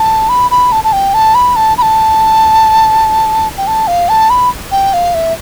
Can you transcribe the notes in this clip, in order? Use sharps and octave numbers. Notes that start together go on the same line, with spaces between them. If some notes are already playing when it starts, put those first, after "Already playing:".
Already playing: A5
B5
B5
A5
A5
G5
A5
B5
A5
B5
A5
G5
A5
F5
A5
B5
G5
F5
E5